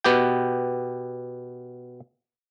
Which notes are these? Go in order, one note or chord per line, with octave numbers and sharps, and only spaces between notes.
B2 B3 G4 G5